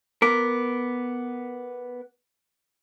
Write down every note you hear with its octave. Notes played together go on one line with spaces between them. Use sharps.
B3 A#4 D6 B6